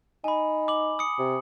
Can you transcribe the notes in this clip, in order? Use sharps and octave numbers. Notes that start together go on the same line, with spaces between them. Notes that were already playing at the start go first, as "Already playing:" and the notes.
D#4 G#5 B5
D6 F#7
D#6 C#7
C3